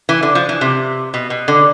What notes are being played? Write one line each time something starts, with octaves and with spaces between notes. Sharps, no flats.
E3
D3
F3
E3
C3
B2
B2
D3